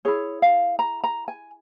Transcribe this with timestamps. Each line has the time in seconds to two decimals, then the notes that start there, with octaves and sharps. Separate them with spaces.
0.05 E4 G#4 C#5
0.42 F5
0.79 A#5
1.04 A#5
1.28 G#5